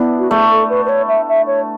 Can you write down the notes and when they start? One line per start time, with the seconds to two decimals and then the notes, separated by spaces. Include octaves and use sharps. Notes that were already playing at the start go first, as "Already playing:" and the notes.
Already playing: B3 D4 E4
0.19 F#4
0.30 A3 G#4
0.50 A4
0.69 B4
0.85 B4
0.88 C#5
1.07 E5
1.28 E5
1.47 C#5